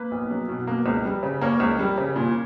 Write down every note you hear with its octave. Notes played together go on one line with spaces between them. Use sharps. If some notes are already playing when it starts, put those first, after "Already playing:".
Already playing: A#3 B4
B1
F#3
B2
A#3
C#2
G3
C#3
A#3 A#4 C#5
C#2
G3
C#3
A#2